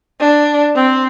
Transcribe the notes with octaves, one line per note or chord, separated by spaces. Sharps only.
D4
C4